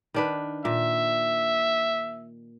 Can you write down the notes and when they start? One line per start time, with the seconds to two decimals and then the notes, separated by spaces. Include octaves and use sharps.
0.14 D#3 D4 B4
0.65 A#2 E5